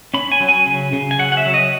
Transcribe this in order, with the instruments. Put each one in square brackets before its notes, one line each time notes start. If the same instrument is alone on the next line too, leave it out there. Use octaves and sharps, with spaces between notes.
[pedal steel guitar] C#4 B5
G#5
F#3
G#5
C#3
C#3
G#5
F#3 F#5
F#5
E5
F#3
D#5